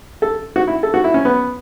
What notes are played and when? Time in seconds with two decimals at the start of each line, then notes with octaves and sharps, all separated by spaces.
0.22 A4
0.56 F#4
0.67 E4
0.83 A4
0.94 F#4
1.04 E4
1.14 C#4
1.25 B3